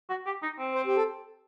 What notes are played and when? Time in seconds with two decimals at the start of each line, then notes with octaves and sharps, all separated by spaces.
0.09 F#4
0.26 G4
0.43 D#4
0.59 C4
0.75 C5
0.86 G4
0.97 A4